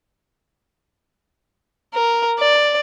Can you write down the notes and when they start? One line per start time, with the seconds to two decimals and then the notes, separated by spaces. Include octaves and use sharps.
1.94 A#4
2.39 D5